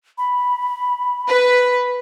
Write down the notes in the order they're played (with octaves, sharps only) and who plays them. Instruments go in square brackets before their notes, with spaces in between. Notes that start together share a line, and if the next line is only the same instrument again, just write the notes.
[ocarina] B5
[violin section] B4